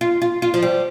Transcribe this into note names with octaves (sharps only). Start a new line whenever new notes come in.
F4
F4
F4
F3
G3